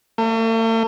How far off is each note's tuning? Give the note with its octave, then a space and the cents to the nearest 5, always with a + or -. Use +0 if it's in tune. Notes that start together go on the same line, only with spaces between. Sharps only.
A3 +45